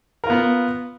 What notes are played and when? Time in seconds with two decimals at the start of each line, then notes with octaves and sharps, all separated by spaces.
0.24 A#4
0.27 F4
0.30 B3